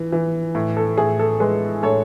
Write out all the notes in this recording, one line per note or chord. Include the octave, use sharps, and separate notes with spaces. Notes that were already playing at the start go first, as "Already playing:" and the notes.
Already playing: E3
E3
A2
A4
A2 G#4
A4
G#3 G#4 B4
A2 A4 C#5